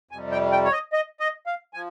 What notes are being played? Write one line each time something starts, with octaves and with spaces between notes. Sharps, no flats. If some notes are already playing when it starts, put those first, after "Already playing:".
F2 C3 G3 G#5
G5
G5
C#5
D#5
D#5
D#5
F5
F3 G#5